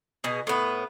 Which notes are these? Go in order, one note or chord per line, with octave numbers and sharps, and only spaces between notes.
B2 G#4
A2 B3